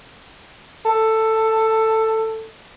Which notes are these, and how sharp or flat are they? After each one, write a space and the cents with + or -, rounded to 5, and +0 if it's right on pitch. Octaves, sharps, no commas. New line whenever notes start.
A4 +10